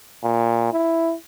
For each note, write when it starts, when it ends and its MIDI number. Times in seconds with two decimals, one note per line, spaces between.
0.24 0.68 46
0.73 1.14 64